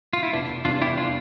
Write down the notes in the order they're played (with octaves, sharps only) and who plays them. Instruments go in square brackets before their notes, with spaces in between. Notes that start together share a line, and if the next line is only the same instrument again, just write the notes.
[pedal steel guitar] F4
E4
[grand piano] F1 [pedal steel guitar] B3 D4
[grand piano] E2 C3 E3 G3 [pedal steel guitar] D4 F4
[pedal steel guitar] E4 G4
D4 F4